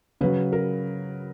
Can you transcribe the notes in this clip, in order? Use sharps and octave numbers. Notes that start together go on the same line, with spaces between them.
C#3 F#3 B4
A#4